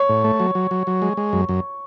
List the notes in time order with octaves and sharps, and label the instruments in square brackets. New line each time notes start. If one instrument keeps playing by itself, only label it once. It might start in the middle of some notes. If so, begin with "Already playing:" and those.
Already playing: [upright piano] C#5
[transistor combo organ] A2
A3
F#3
F#3
F#3
F#3
G#3
G#3
F#2
F#2